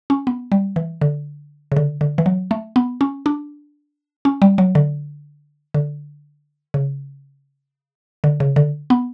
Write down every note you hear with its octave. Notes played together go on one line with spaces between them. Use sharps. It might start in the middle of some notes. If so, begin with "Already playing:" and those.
C#4
B3
G3
E3
D3
C#3
D3
D3
E3
F#3
A3
B3
C#4
D4
C#4
G3
F#3
D3
D3
C#3
D3
C#3
D3
B3